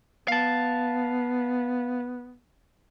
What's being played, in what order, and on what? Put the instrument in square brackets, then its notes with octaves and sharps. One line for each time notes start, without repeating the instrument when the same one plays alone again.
[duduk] B3 [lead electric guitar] F5 A5